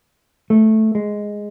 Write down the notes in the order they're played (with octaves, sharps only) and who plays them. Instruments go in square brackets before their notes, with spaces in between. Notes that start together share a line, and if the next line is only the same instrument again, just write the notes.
[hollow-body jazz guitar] A3
G#3